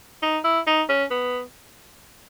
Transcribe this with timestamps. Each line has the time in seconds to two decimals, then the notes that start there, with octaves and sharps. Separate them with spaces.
0.22 D#4
0.44 E4
0.67 D#4
0.89 C#4
1.11 B3